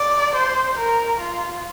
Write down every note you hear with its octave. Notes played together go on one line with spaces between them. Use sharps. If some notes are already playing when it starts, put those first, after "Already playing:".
Already playing: D5
C5
A#4
F4